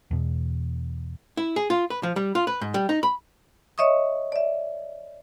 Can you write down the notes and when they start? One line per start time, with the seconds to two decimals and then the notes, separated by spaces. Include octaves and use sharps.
0.11 E2 B2
1.37 E4
1.56 G#4
1.70 F4
1.90 B4
2.03 F3
2.16 G3
2.35 F4
2.47 B4
2.61 G#2
2.74 G3
2.89 D#4
3.03 B5
3.78 C#5 D#5 E5 C#6 D#6
4.32 D5 E5